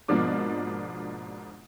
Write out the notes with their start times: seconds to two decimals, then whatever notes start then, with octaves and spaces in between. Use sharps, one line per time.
0.08 G#2 B2 F3 A#3 D4 D6